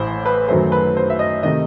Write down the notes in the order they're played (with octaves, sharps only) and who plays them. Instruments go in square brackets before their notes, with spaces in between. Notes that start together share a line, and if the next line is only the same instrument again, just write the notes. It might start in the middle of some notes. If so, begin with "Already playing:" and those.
Already playing: [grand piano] A1 A2 E3 C5
B4
F#2 D#3 F#3 A3 C5
B4
C5
E5
D#5
C3 D#3 A3 D#5